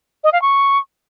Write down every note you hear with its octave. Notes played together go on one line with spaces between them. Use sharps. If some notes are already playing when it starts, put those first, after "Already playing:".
D#5
F5
C#6